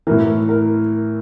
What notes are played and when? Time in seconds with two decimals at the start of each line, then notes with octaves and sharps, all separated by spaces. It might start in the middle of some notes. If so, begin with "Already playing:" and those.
0.07 A2 E3 A#4
0.49 A#4